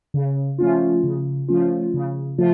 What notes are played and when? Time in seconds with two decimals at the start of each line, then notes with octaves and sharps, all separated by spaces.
0.14 C#3
0.58 F3 A3 C#4 F4
1.04 C#3
1.49 F3 A3 C#4 F4
1.94 C#3
2.38 F3 A3 F4